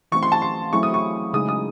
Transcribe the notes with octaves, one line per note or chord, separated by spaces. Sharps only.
E3 A3 C4 C#6
C6
A5
C6
F#3 A3 C4 E4 G#4 C#6
D#6
C#6
C#3 G#3 D#4 G#4 D#6
D#6